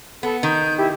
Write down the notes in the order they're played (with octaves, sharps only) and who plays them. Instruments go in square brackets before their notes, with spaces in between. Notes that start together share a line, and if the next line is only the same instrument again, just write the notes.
[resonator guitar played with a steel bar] B3 [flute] A4
[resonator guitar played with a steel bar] D#3 [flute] G6
[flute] E4 [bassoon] G4